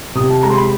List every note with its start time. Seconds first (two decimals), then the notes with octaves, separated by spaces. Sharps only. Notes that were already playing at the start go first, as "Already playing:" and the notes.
0.15 C3 D#6
0.30 A5
0.43 G#3 A#5
0.50 C6
0.57 B5